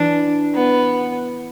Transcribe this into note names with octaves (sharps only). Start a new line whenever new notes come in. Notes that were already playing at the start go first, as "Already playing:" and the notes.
Already playing: E3 D4
B3